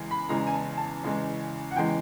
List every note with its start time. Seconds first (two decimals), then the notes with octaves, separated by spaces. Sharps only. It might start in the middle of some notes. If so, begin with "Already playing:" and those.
Already playing: E2 C#3 E3 G#3
0.11 B5
0.29 E2 C#3 E3 G#3 A#5
0.47 G#5
0.54 A5
0.77 A5
1.03 E2 C#3 E3 G#3
1.71 F#5
1.76 E2 C#3 E3 G#3 G5